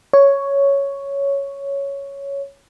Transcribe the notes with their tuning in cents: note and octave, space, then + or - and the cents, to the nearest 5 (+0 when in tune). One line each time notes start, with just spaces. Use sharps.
C#5 +5